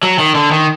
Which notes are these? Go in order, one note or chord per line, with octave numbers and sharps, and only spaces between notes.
F#3
D#3
D3
D#3